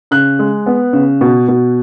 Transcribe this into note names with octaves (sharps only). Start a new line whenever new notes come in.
C#3 F#6
G#3
B3
C#3
B2
B2